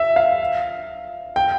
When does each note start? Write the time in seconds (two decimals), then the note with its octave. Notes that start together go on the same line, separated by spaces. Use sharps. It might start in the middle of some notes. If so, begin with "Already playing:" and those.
Already playing: E5
0.16 F5
1.36 G5